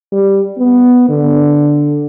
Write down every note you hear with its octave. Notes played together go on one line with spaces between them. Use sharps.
G3
B3
D3